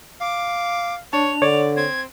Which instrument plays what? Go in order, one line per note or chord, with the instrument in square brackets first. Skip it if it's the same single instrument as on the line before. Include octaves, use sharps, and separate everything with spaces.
[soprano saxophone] F5 [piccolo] D6
[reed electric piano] D4 A5 [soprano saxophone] C#5 [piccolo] F7
[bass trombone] D3 [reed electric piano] C#5 [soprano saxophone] D5
[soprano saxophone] C4 [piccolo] G#6